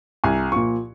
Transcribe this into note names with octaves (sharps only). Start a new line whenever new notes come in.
C2 G#5
A#2 F3 C#6